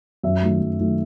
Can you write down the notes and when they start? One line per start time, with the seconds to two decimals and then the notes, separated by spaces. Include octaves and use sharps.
0.23 F#2 E5
0.42 D#3 F#3 A3
0.61 F#2
0.79 D#3 F#3 A3